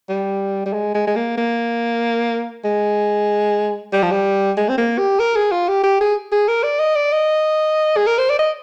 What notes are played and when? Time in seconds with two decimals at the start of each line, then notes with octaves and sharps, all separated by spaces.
0.09 G3
0.66 G3
0.73 G#3
0.95 G#3
1.07 G#3
1.16 A#3
1.37 A#3
2.64 G#3
3.93 G3
4.03 F3
4.11 G3
4.57 G#3
4.69 C4
4.78 A#3
4.98 G4
5.20 A#4
5.36 G#4
5.52 F4
5.68 G4
5.84 G4
6.01 G#4
6.32 G#4
6.48 A#4
6.63 D5
6.80 D#5
6.96 D5
7.12 D#5
7.96 G#4
8.07 A#4
8.18 C5
8.29 D5
8.39 D#5